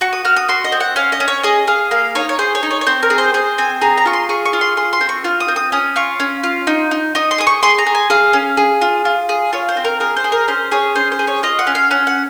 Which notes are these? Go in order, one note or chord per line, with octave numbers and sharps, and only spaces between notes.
F#4 C#6
D#6
F#4 F6
D#6
F#4 C6
D#5
C4
F#5
C#4 F5
D#5
C#4
C#5
G#4 D#5
G#4 F5
A#3 F5
D#4 C#5
C#5
G#4 C5
C#5
D#4
C#5
C#5
C4 C5
A#4
G#4
C5
G#4 C5
C4 G#5
G#4 A#5
A#5
F4 C#6
C6
G#4 C#6
C#6
F4
C6
G#4 C6
C6
C4
C#6
F4 F6
D#6
C4
D#6
C#4 D#6
F4 C#6
C#4
F4
D#4
D#4
D#4 D#6
C6
G#4 D#6
C#6
G#4 C6
A#5
G#4
G#5
G#4 F5
C#4
G#4
F4
F4
G#4
F4 C#5
C5
C4
A#4
G#4 A#4
C5
G#4
A#4
C#4 C5
G#4 C#5
C#4 C5
C5
G#4
C#5
F4 D#5
F#5
C#4
F5
C#4 F#5
F#5